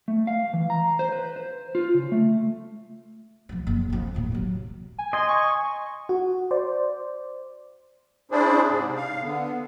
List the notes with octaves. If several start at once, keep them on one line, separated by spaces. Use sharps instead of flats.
A3
F5
E3
A#5
C5
B4
C5
F4
C#3
A3
E3 F3
F#1
F2 C4
D#2 A2
C3 F#3
G#5
D#5 G#5 C6
C#6
F#4
C5 D5
C#4 D4 E4 G#4 C5 D5
G#2 C3
F5
D3 B3